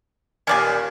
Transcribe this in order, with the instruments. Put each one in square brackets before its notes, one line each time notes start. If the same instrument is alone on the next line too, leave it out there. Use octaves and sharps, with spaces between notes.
[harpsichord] D#2 A#2 D#3 [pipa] C#4 D5 G#5